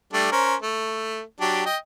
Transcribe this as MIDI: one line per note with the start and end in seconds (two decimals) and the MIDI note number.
0.13 0.28 55
0.13 0.28 57
0.13 0.28 62
0.32 0.55 61
0.32 0.55 70
0.32 0.55 72
0.62 1.21 57
1.40 1.64 54
1.40 1.64 62
1.40 1.64 67
1.66 1.77 75
1.66 1.77 79